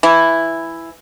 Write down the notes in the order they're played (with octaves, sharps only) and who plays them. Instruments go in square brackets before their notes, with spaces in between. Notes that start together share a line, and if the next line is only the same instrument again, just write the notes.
[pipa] E3 E4